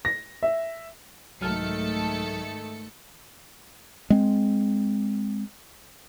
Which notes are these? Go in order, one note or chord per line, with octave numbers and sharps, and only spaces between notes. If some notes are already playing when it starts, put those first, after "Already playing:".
A#6
E5
C2 G#2 D#3 F#3 A3 A4 F6 C#7
G#3 C4